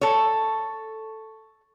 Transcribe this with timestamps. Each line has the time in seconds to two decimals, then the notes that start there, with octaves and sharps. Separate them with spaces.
0.01 A4 C#5